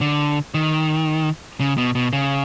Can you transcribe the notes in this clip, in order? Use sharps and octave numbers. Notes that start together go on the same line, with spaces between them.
D3
D#3
C#3
B2
B2
C#3